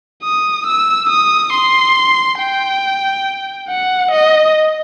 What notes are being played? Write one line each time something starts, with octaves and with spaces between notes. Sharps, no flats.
D#6
E6
D#6
C6
G5
F#5
D#5